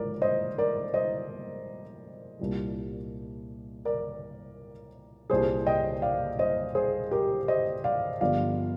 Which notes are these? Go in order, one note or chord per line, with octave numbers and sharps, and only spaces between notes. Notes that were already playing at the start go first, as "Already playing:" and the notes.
Already playing: A#1 G#2 F3 A#4 D5
C5 D#5
A#4 D5
C5 D#5
C2 A#2 G3
A#4 D5
C2 A#2 G3 G#4 C5
D#5 G5
D5 F5
C5 D#5
G#4 C5
G4 A#4
C5 D#5
D5 F5
G1 G2 F3 D5 F5